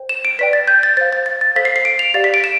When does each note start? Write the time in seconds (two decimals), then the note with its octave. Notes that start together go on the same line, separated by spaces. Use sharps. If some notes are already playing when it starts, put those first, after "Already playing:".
Already playing: C5 G5
0.09 E7
0.25 D7
0.39 B4 D5 G5 B6
0.53 A6
0.67 G6
0.83 A6
0.97 C5 A6
1.01 F5
1.13 A6
1.26 A6
1.41 A6
1.56 A4 C5 F5 B6
1.65 C7
1.76 C7
1.85 D7
1.99 F7
2.14 G4 D5 F5 A6
2.24 B6
2.34 D7
2.44 E7